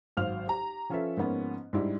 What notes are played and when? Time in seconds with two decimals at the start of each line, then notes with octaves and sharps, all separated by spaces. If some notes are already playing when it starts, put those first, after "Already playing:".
0.17 G#1 F#3 C5 F5 F6 F7
0.47 G4 A#5
0.90 F3 C#4 F4 A4 B4 E5
1.17 G#2 F3 A#3 B3 C#4
1.73 G#2 G3 D4 E4